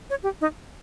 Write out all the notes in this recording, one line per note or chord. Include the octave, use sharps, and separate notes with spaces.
C#5
G4
D#4